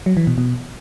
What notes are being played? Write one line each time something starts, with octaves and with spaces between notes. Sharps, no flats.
F#3
E3
B2
B2